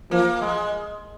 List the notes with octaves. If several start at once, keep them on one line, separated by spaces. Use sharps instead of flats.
F3 A#3
G#3